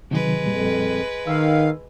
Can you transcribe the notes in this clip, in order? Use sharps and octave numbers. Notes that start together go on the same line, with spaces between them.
C3 D#3 F#3 G#3 B4
F2 A#2 G3
D#3 F5 E6